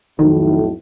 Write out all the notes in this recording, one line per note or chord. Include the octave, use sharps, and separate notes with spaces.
B1 F2 A2 D#3